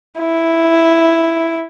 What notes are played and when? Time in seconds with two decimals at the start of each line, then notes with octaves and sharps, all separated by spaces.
0.19 E4